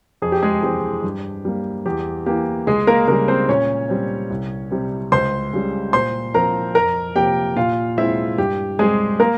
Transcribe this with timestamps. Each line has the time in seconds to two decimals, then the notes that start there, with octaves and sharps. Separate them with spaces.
0.22 F2 G#4
0.32 G4
0.42 G#3 G#4
0.63 E3 G#3 C4 G4
1.04 G2
1.45 G3 A#3
1.86 E2 G4
2.26 E3 A#3 G4
2.67 C#2 G#3 G#4
2.87 A#3 A#4
3.08 C#3 G3 A#3 A#4
3.28 C4 C5
3.49 A#2 C#4 C#5
3.89 G3 C4
4.30 C2
4.71 C3 G3 C4
5.12 C#2 C5 C6
5.53 C#3 G3
5.93 A#2 C5 C6
6.34 F3 C4 A#4 A#5
6.75 F2 A#4 A#5
7.15 C3 F3 A#3 G4 G5
7.56 A#2 F4 F5
7.98 G#3 C4 E4 E5
8.38 G2 G4
8.79 G3 G#3 C4 G#4
9.20 A#3 A#4